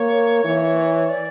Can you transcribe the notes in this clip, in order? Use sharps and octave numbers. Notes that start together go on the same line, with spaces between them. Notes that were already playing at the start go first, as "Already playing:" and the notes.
Already playing: A#3 C#5
E3
D5